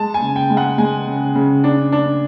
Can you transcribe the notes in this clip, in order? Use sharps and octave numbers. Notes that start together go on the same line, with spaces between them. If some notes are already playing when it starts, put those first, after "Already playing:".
Already playing: G#3 A5
G#5
C#3
G5
G#3
F#5
G#3 G#5
C#3
C#3
D4
D4